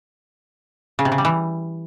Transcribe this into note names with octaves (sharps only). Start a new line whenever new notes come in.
C#3
C3
C#3
G3
E3